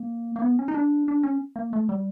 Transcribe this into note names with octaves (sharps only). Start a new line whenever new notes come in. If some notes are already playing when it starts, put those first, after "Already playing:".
Already playing: A#3
A#3
B3
C#4
D#4
D4
D4
C#4
A#3
A3
G3